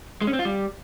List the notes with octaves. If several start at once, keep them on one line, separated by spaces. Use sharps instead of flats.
G#3
C#4
C4
F4
G3